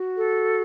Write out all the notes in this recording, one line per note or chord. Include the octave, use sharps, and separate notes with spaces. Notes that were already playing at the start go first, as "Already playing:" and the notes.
Already playing: F#4
A4